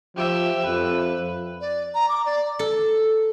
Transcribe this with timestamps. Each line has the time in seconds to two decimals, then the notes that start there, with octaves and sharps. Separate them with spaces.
0.17 F3 G4 E5
0.66 F2 B4
1.61 D5
1.95 A#5
2.09 D6
2.26 D5
2.59 A4